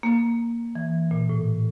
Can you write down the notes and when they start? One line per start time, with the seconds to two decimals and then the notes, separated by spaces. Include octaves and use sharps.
0.03 A#3
0.75 E3
1.11 A#2
1.29 A2